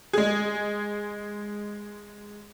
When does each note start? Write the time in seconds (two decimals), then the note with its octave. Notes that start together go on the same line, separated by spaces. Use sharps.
0.13 G#3 G#4